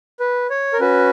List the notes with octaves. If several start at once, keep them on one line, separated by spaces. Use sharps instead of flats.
B4
C#5
A#4
C#4 F#4 B4